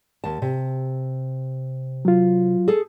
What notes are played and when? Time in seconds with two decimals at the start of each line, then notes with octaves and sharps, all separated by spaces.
0.24 D#2 A5
0.42 C3
2.05 F#3 F4
2.68 G#4 A4